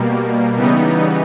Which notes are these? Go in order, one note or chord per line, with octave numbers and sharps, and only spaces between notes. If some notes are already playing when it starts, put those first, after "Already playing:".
Already playing: B2 G3 A#3
C#3 E3 G3 B3 D#4